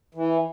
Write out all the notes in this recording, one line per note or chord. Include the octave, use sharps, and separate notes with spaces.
E3